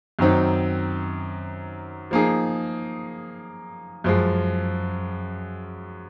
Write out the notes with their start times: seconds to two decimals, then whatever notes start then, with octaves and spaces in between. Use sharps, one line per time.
0.19 F#2 D#3 F#3 C4 D#4
2.11 F3 A#3 D#4 G#4
4.04 F#2 F3 G#3